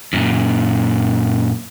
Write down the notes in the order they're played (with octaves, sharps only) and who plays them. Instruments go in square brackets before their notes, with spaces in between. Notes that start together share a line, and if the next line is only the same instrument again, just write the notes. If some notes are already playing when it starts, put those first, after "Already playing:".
[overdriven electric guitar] F#2 A#2